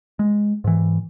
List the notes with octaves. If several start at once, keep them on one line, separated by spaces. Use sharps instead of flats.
G#3
G#2 E3